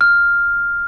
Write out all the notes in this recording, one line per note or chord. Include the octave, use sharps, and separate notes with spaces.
F6